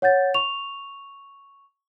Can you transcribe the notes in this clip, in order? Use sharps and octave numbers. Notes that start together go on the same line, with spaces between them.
C#5 F#5 G6 A6
C#6 F7